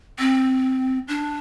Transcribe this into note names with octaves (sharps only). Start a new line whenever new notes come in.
C4
D4